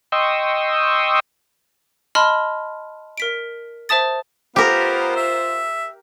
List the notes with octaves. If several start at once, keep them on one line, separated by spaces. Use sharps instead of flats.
D#5 G5 C6 C#6 D#6 E6
D#5 A5 B5 C6 F6 G7
A#4 B6 D7
C5 E5 A5 D#6 A6
B3 F4 G4 A#4 C5
E5